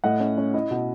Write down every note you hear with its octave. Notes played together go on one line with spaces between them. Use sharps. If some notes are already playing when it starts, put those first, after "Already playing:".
A2 D#5 F#5
C#4
C#4
E4 D#5
B2